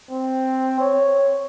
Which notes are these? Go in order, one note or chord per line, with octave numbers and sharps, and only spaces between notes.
C4
C#5